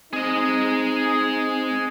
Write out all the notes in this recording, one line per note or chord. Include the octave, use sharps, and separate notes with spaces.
C4 D#4 G#4 D#5